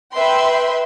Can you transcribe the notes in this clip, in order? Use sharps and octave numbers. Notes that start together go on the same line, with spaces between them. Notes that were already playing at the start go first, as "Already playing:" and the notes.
B4 E5 G5 C6